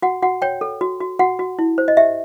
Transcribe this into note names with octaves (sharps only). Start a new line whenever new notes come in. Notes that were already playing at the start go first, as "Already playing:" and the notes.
F#4 F#5
F#4 F#5
C#5 G5
A4
F#4
F#4
F#4 F#5
F#4
E4
C5
D#5
G4 E5